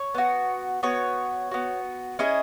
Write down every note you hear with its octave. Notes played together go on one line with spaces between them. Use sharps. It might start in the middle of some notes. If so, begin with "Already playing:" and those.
Already playing: C#5
B3 F#4
B3 F#4 C#5
B3 F#4
C#4 E4 G#4 D#5